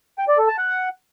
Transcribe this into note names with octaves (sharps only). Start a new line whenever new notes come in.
G5
D5
A4
A5
F#5